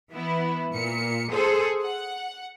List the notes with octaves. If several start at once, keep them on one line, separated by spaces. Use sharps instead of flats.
E3 B3 E4
A#2 C#7
G#4 A4 C5
F#5